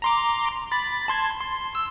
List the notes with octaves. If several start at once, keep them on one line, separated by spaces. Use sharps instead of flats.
A#5 C6 D6
B5 A6
A5 C6 G#6
C6
E6